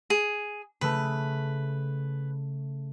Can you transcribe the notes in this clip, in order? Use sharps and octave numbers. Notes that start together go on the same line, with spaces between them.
G#4
C#3 A3 B4